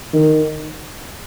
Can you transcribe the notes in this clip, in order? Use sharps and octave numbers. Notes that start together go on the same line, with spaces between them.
D#3